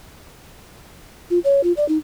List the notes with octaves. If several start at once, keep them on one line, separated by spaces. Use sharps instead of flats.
F4
C#5
F4
D5
D#4